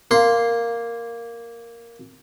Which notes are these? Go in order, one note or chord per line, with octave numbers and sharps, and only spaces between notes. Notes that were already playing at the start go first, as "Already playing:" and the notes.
A#3 C6